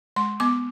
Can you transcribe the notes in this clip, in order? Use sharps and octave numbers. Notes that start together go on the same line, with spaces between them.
G#3 C6
B3 D6